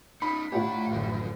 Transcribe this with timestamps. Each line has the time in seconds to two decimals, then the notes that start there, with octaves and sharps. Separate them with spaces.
0.22 C#4 D#4 B5
0.52 A2 D4 E4 F4 G4 C#5 F#5
0.89 A1 F#2 D3 E3 F3